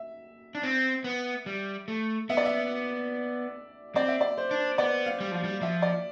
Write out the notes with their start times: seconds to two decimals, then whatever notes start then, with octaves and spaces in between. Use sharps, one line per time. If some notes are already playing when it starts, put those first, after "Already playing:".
Already playing: E5
0.55 D4
0.63 C4
1.04 B3
1.46 G3
1.88 A3
2.29 B3 E5
2.37 D5
2.46 E5
3.96 C4 D5
4.08 E5
4.21 D5
4.37 C5
4.51 D4
4.78 B3 D5
5.06 F5
5.20 G3
5.32 F3 F5
5.44 G3
5.61 F3 E5
5.82 D5